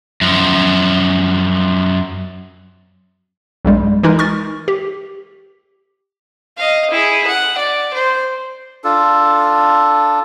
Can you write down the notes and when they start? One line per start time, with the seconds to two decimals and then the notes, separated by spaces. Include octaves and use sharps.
0.21 F#2 F3
3.65 B1 G2 G3 G#3
4.03 E3 G#3 D#4 A#4
4.19 C#6 F6 A6
4.68 G4
6.57 D#5 F5
6.91 E4 G#4
7.27 F#5
7.58 D5
7.94 C5
8.84 D4 F4 A4